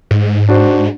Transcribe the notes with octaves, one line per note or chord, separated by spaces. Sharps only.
G#2
D4 F#4 C5